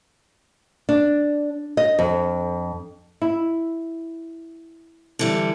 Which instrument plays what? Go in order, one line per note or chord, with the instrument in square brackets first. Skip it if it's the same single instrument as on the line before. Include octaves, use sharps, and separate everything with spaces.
[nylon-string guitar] D4
D#5
F2
E4
[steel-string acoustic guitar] D3 E3 G3